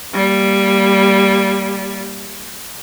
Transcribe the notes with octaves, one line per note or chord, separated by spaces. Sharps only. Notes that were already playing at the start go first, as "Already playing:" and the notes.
G3 A#3